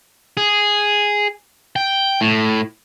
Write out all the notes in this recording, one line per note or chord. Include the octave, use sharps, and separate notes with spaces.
G#4
G5
A2